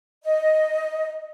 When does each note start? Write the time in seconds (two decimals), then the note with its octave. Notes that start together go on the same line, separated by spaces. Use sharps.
0.24 D#5